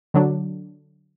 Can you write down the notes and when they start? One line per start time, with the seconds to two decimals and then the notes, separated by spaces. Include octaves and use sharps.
0.14 D3 F#3 D4